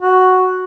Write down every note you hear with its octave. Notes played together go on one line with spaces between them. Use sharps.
F#4